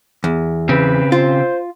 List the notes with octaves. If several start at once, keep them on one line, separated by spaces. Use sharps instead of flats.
E2
C#3 C4 B4
F4 C5